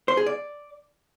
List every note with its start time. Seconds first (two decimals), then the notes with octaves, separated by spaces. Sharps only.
0.08 C5
0.17 G#4
0.26 D5